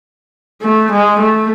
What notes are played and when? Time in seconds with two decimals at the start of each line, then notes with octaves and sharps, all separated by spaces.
0.62 A3
0.92 G#3
1.20 A3